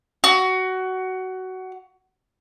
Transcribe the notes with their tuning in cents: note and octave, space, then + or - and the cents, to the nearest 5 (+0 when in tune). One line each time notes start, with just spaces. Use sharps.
F#4 +15